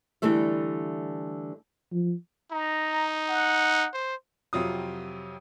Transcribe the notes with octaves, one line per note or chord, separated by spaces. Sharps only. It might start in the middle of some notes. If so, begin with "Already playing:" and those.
D3 E3 G3 A3 E5
F3
D#4 A#5
F#5
C5
F2 C3 F#3 F4 D#6